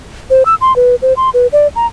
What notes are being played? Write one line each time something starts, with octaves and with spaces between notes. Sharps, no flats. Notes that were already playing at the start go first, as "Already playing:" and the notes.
C5
E6
C6
B4
C5
C6
B4
D5
A#5